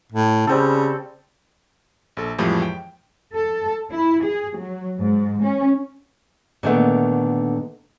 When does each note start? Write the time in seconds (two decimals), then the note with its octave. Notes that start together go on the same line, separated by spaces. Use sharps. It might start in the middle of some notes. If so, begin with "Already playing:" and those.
0.12 A2
0.47 C#3 G3 C4 A4
2.17 A#1 A4
2.38 F2 A2 E3 F3 G3 G#3
2.62 G5
3.35 A4
3.91 E4
4.23 G#4
4.55 F#3
4.96 G#2
5.43 C#4
6.63 A#2 D3 D#3 G3 A3 B3